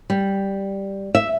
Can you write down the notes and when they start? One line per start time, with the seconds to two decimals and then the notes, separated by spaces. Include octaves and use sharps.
0.10 G3
1.15 E5